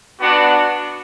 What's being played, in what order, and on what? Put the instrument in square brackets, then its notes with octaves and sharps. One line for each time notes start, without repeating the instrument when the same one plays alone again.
[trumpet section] B3 D4 F#4 F#5